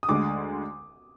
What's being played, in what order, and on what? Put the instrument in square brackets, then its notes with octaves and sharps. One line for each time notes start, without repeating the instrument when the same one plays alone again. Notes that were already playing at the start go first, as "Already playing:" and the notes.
[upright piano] D#6
[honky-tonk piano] D2 D3 G#3 [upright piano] D6